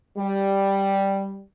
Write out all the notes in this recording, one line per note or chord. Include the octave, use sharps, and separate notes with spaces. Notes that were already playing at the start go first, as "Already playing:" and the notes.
G3